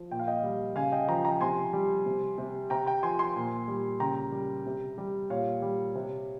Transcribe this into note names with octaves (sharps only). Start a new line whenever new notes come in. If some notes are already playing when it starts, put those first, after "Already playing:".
Already playing: F3
A#2 G5
F5
D#5 G5
G3
C#3 F5 G#5
D#5 G5
F3 G5 A#5
G5 A#5
C3 G#5 C6
G3
C3
C3
C3 G5 A#5
G5 A#5
F3 G#5 C6
G#5 C6
A#2
G3
C#3 G5 A#5
G3
C3
G3
A#2 C#5 F5
G3
C3